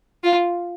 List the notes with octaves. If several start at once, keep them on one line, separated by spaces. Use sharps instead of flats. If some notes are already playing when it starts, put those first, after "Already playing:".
F4